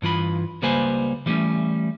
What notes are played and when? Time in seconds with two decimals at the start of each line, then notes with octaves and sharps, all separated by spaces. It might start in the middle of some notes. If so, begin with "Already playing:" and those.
0.02 G2 E3 F4 B5
0.62 C#2 G3 A#3 B4 C5 G#5
1.26 E3 G3 A3 C4 C#4